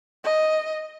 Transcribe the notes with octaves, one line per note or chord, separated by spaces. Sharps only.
D#5